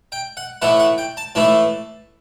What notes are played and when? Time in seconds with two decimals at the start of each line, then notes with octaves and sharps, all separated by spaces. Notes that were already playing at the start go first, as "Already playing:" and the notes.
0.12 G5
0.37 F#5
0.62 A2 E3 A3 E4 F#5
0.79 F#5
0.98 G5
1.17 A5
1.35 A2 E3 A3 E4 A5